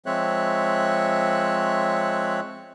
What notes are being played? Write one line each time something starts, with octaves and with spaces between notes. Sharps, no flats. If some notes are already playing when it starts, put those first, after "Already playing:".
F3 G#3 C4 C#5 E5 F#6